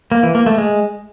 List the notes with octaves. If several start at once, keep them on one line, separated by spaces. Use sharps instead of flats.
A#3
E3
A#3
A3
G#3